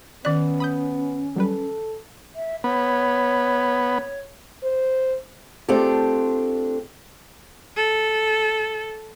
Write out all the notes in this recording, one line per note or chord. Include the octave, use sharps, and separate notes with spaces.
D#3 B3 C#4 D5 F#6
B5 D#6 G6
F#3 G3 A4 B4
E5
B3 C#5
C5
A3 C4 D4 F4 G4
A4